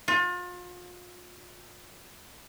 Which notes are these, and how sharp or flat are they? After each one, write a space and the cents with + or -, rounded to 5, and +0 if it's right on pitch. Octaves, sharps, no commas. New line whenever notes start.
F4 +35